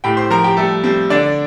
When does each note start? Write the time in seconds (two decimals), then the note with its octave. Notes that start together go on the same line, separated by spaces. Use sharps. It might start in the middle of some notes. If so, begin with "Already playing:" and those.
0.04 A2 G4 G5
0.17 C5 C6
0.30 F3 A#4 A#5
0.44 G4 G5
0.57 G3 A3 A4
0.84 G3 C4 C5
1.10 D3 D4 D5